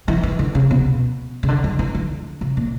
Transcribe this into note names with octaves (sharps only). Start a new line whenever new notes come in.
E3
E3
D3
C#3
B2
C#3
D3
F#3
E3
D3
C#3
A#2